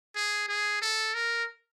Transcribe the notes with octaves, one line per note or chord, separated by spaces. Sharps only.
G#4
G#4
A4
A#4